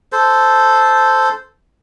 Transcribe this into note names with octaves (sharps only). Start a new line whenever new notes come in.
A4 C5